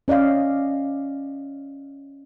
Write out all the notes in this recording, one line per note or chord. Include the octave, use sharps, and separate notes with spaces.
C#4 D5 D#5 F5